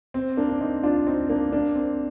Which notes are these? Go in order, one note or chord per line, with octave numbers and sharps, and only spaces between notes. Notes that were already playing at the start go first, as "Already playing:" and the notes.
C4
A#3 D4
D4
C4 D#4
D4 F4
C4 D#4
A#3 D4
A#3 D4
C4